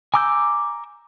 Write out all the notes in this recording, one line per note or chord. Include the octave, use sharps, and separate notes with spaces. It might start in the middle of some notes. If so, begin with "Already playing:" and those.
G#5 A#5 D6 E6 G6